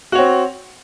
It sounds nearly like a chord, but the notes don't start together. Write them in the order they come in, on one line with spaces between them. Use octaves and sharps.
F#4 C#5 C4